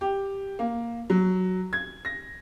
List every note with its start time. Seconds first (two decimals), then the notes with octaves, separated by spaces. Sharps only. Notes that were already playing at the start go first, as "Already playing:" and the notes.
0.01 G4
0.59 A#3
1.10 F#3
1.73 G#6
2.05 A#6